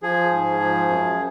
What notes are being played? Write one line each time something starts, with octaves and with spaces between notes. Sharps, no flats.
F3 G#4
G#2
F3
F#2